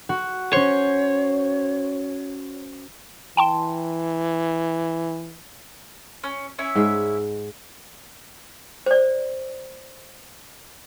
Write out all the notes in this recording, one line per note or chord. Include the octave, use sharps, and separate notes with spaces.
F#4
C#4 C5 C#5
E3 G5 A5 C6
C#4
C#4 E4 E5
G#2 G#3
C5 D5